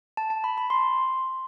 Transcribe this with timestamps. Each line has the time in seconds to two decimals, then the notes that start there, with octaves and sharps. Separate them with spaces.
0.17 A5
0.30 A5
0.44 B5
0.58 B5
0.70 C6